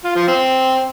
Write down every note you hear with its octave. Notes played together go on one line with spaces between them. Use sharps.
F4
F3
C4